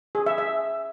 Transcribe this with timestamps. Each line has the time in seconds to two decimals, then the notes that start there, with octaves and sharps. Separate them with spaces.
0.15 G#4
0.26 E5
0.38 E5